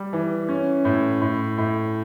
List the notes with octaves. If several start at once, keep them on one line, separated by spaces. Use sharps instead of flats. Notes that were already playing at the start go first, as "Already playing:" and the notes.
Already playing: G3
E3
C#4
A2
A2
A2